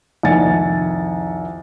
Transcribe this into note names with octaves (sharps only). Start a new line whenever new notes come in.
C2 F2 D#3 G#5 A6 C#7